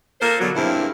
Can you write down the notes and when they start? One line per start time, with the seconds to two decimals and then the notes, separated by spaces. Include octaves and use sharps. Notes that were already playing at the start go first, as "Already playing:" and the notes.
0.20 A#3 A4 A#4 C5
0.40 B2 D3 F#3
0.56 G2 C#3 A#3 C4 E4